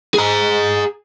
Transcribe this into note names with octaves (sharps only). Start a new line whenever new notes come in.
G#4 A#5